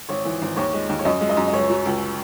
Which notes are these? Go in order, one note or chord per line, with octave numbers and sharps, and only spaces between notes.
G#1 C#5
E3
G#1
D#2 C#5
G#3
D#2
C#5
F#2 D#5
G#3
D#5
F#2
D#5
C#2 C#5
F#3
C#2